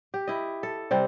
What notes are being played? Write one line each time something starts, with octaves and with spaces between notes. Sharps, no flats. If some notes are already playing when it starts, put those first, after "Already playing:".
G4
E4 D#5
A4
C3 G3 C4